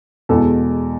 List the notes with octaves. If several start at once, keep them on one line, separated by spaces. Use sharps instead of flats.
E2 B2 G#3 A4